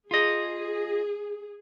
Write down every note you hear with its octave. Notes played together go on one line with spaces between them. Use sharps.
F4 G#4 D#5